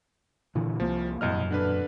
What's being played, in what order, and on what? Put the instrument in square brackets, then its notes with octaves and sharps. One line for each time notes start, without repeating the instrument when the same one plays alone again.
[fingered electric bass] A#2 D3 E3
[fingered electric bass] C2 A#3 [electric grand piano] F3
[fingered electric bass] E1 F#2 A#2 [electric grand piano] C2 D#5 F6
[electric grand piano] D3 D4 B4